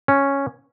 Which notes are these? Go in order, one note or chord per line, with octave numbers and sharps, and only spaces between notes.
C#4